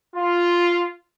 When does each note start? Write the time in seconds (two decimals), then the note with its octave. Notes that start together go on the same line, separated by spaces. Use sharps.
0.16 F4